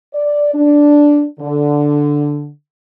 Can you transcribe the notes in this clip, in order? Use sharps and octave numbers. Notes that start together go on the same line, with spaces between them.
D5
D4
D3